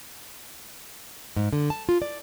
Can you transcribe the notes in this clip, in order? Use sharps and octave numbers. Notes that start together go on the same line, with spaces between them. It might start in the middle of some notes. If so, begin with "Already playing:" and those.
G#2
D3
A5
F4
D5